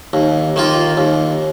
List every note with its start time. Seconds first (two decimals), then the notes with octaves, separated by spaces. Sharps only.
0.13 D#2
0.56 D#3 A#3 F4
0.97 D#2